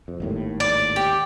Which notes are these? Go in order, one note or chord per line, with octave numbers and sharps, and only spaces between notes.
F2
G#1 D#2 A2
D5
G4